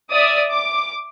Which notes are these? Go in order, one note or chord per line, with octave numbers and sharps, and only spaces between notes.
D5 E5 D#6
D6